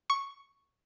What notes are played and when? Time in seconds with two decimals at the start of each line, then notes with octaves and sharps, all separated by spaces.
0.10 C#6